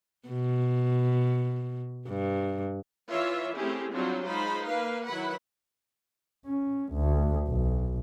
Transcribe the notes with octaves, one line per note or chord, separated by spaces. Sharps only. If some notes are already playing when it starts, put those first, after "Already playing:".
B2
G2
E3 F4 C#5 E5
A3 C4 C#4 E4 G4 G#4
F#3 G3 C4 D4 F4 F#4
G#3 D#4 F4 C5 B5
A#3 A#4 B4 F5
D#3 F#3 E4 B4 F#5 B5
C#4
D2
B1